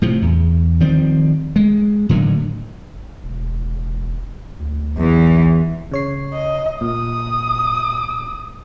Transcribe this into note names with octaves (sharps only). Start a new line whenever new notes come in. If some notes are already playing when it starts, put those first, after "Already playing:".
A2 C3 F3
E2
D#3 F3 G3 C4
G#3
A2 D3 D#3 F#3
E1
D2
B1 E2 E3
C#3 C#5 C7
D#5
A#2 D#6